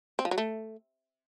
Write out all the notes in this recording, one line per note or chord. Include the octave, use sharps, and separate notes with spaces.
C4
F3
F#3
A3